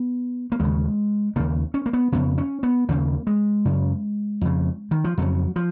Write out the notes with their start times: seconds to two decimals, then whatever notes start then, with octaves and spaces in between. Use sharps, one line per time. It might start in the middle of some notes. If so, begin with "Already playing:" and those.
Already playing: B3
0.52 A#3
0.60 D#2 C#3 G#3
1.36 D#2 C#3 A#3
1.74 C#4
1.86 A#3
1.93 B3
2.12 F2 C#3 B3
2.38 C#4
2.63 B3
2.89 D#2 C#3 A#3
3.27 G#3
3.65 F#2 C#3
4.41 F2 C#3
4.91 D#3
5.04 F3
5.18 F2 C#3 F#3
5.56 F3